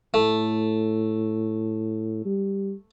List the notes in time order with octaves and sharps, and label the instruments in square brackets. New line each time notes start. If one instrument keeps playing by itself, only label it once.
[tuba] A2 [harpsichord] A3
[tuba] G3